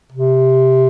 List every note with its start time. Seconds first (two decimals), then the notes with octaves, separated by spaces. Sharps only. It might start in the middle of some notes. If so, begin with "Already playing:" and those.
0.12 C3